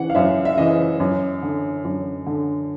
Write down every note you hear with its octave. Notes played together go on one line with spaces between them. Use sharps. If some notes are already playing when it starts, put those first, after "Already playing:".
Already playing: C#3 E3 F#5
F5
F#2 E5
E5
C#3 E3 D#5
F#2
D3
F#2
D3